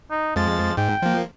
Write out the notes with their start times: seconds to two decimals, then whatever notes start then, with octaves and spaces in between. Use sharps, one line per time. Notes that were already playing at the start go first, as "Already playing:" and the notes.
0.11 D#4
0.36 F2 F3 G#3 A6
0.77 G#2 G5
1.02 F3 A#3